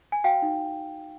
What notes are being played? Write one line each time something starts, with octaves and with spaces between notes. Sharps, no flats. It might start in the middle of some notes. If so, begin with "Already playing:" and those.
G#5
F#4 F5 G5
D#4